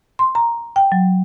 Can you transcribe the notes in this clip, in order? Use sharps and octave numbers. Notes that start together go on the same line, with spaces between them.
C6
A#5
G5
F#3